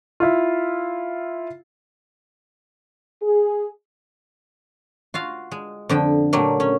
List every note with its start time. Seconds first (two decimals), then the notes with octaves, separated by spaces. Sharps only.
0.20 E4 F4
3.22 G#4
5.14 F4 F#4 F5
5.52 G#3
5.89 F2 D3 G5
6.33 A#2 F#3 G3 A3 A#3
6.60 C#4